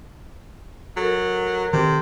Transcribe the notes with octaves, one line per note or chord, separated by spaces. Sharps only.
F#3 A4 A#4
C3 D#3